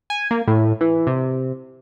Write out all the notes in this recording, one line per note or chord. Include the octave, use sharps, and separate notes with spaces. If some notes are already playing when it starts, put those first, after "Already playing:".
G#5
A#3
A2
E3
C3